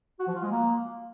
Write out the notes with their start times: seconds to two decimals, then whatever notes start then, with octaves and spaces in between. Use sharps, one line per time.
0.20 F#4
0.27 F3
0.35 F4
0.43 G#3
0.51 A#3